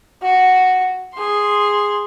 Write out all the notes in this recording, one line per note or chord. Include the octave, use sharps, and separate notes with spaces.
F#4
G#4 C6